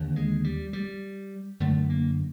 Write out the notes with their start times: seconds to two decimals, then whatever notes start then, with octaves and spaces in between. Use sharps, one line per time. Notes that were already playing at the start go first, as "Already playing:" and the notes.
Already playing: D#2 D3
0.16 G#3
0.44 G3
0.73 G3
1.60 F#2 D3 A3
1.89 A#3